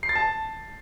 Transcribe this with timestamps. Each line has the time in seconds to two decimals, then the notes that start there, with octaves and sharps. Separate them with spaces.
0.03 C7
0.09 A6
0.15 A5